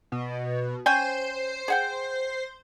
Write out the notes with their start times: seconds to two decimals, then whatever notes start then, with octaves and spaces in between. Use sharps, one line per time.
0.12 B2
0.86 C#4 C5 G5 G#5
1.68 G#4 F#5 G5